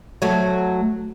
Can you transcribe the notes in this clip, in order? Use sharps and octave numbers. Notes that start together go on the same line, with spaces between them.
F#3 A3